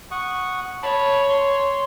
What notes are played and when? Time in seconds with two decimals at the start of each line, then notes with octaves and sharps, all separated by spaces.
0.11 F#5 C#6 D#6
0.83 C#5 A5 B5
1.29 C6